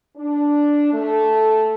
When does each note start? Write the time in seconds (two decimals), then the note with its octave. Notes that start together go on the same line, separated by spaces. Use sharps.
0.17 D4
0.92 A3